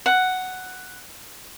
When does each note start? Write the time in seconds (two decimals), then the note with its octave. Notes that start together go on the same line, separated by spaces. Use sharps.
0.06 F#5